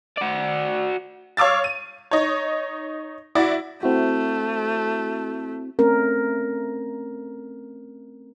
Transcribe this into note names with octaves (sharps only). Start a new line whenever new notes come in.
F#4 D5
C#5 F5 D6 E6 A6
D#7
D#4 C#5
E4 F#4 D5
A3 C4 E4 F#4
A3 C4 C#4 A#4